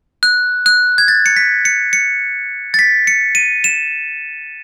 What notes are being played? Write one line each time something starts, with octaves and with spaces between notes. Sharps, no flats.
F#6
F#6
G#6
A6
C#7
B6
C#7
C#7
A6
B6
C#7
D#7
E7